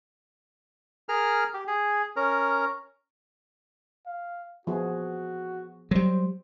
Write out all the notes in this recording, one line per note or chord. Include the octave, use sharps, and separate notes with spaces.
G#4 A#4 F6
G4
G#4
C#4 A#4
F5
F3 B3 F#4 G#4
F#3 G3 C5